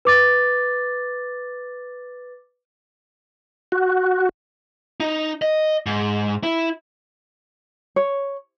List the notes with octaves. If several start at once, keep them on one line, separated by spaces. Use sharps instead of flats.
B4 D6 A6
F#4
D#4
D#5
G#2
E4
C#5